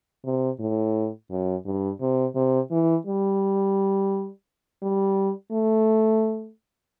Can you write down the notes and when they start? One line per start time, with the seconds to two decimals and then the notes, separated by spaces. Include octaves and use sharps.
0.25 C3
0.59 A2
1.31 F#2
1.66 G2
2.01 C3
2.36 C3
2.71 E3
3.07 G3
4.83 G3
5.52 A3